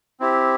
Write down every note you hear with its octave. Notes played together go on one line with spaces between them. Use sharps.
C4 E4 G4